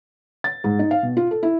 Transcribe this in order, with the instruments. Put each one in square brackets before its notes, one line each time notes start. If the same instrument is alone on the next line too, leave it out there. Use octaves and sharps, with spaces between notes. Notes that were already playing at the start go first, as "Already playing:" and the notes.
[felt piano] A6
G#2
D#4
F5
B2
F4
A4
E4